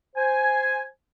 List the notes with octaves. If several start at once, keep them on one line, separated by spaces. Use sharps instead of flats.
C5 G#5